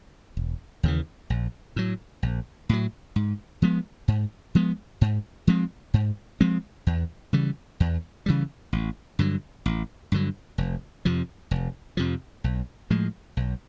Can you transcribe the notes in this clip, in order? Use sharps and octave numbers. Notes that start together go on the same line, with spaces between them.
E1
D#2 C#3 E3
A#1
A2 F#3
A#1
A2 F#3
G#2
F3 G#3 B3
G#2
F3 G#3 B3
G#2
F3 G#3 C4
G#2
F3 G#3 C4
E2
C#3 E3 G3
E2
C#3 E3 G3
A1
G2 D3 F#3
A1
G2 D3 F#3
F1
F2 C3 F3
F1
F2 C3 F3
B1
A2 F3 G#3
B1